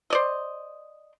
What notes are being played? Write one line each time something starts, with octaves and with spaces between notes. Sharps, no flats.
C5 D5 D#5